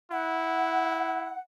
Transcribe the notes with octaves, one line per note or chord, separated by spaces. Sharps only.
E4 F#5